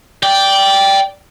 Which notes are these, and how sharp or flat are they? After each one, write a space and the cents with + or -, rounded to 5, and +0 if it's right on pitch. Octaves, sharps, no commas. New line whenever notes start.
D5 -10 G5 +0